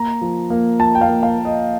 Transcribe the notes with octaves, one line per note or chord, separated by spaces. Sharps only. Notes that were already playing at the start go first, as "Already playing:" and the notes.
Already playing: A#3 A#5
F3
A#3
F3 A5
G5
F5
A#3
F5
A#3
D#5